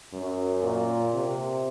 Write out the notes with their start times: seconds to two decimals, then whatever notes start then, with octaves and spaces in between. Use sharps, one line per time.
0.13 F#2
0.63 A#2
1.14 C3